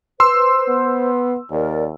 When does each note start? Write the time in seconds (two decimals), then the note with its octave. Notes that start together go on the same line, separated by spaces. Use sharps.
0.20 B4 C5 C6 E6
0.68 B3
1.51 D#2 A#4 D5